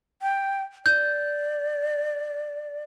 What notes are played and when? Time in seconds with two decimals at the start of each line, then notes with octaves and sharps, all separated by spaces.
0.22 G5
0.86 D5 G6